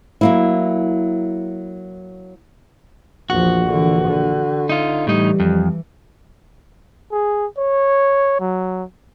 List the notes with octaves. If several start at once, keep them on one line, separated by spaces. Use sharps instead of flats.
F#3 A#3 E4
A#1 E2 F3 F#4
D3 E3
D3
D#4 F4
A2 E3 G3 D#4
F2
G#4
C#5
F#3